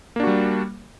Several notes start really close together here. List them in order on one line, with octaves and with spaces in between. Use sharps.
A#3 D4 F#4 G3